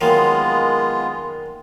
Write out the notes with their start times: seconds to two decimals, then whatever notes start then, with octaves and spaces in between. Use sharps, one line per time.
0.01 D#3 F#3 G#3 A#3 B3 F4